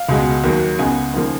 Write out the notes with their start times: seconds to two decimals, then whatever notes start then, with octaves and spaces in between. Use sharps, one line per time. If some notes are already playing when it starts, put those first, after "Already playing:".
Already playing: F5
0.09 C#2 B2 G#3 B3
0.44 D#2 D#3 F#3 A#3
0.79 C#2 C#3 G#3 B3 G#5
1.14 D#2 C#3 F3 A#3